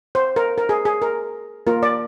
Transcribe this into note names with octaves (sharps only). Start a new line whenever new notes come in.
C5
A#4
A#4
G#4
G#4
A#4
A#3 F4 A#4
D5